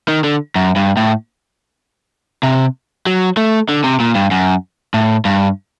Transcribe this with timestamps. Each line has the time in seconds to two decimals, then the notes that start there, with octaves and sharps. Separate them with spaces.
0.08 D#3
0.24 D3
0.56 F#2
0.76 G2
0.97 A2
2.43 C3
3.06 F#3
3.37 A3
3.69 D3
3.84 C3
4.00 A#2
4.15 G2
4.31 F#2
4.94 A2
5.25 G2